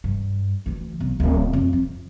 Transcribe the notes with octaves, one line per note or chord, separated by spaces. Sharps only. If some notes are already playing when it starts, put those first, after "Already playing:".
G2
D2 E3
B1
D1 B3
F2
F3